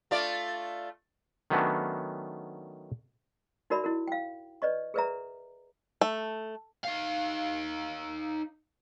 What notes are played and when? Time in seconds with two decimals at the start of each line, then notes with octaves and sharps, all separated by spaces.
0.11 A3 F4 D5
1.50 D#3 F#3 A3 B3 C#4 D4
3.70 D#4 F#4 A#4 D5 E5 B5
3.84 E4 F#4 A#4
4.08 F5 G5
4.62 B4 D5 D#5 C#6
4.94 G#4 A#4 B4 D5 E5 A#5
6.01 A3
6.84 D#4 F5